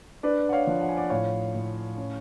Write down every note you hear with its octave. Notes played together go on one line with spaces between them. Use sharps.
D4 B4 D5
F#5
C#5 F5
F3
F#5
G#5
D5 F#5
A2 C#5 F5
A2
C#4